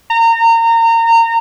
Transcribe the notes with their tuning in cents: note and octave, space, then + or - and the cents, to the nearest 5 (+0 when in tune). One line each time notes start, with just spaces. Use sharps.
A#5 -25